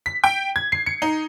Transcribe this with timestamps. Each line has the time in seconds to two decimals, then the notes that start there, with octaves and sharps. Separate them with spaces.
0.06 B6
0.24 G5
0.56 G#6
0.72 C7
0.86 C#7
1.02 D#4